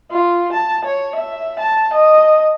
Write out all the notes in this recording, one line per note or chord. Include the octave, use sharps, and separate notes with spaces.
F4
A5
C#5
E5
A5
D#5